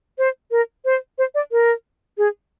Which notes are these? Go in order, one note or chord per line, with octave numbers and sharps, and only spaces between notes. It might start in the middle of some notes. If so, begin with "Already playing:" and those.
C5
A#4
C5
C5
D5
A#4
G#4